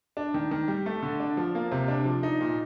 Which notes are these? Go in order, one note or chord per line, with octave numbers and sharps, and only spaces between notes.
D4
D#3
D#3
G3
A3
D3
D4
F3
A#3
C3
D4
F3
D#4
A#2